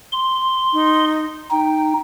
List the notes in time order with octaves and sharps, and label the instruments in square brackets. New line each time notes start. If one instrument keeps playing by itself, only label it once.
[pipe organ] C6
[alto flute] D#4
[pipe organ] D#4 [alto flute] G5